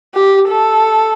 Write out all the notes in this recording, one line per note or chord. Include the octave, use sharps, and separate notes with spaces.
G4
A4